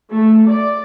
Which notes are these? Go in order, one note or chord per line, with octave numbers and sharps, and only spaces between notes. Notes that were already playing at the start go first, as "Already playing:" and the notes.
A3
D5